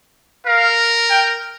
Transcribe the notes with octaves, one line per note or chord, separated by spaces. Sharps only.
A#4 F5
G5